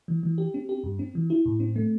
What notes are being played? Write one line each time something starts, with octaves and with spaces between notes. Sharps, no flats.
E3
E3
G4
C4
G4
G2
C4
E3
E4
A2
C4
A3